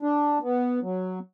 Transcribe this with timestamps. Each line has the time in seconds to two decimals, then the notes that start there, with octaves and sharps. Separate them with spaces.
0.02 D4
0.43 B3
0.82 F#3